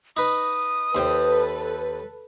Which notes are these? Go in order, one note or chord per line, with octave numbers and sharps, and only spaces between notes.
D#4 B4 D#6
D#2 A4 B4 C5 G5